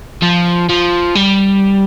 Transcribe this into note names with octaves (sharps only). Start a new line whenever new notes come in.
F3
F3
G3